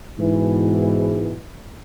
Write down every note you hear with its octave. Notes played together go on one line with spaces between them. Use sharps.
G#2 B2 E3